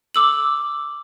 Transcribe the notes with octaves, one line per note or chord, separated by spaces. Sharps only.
D6 E6 F#7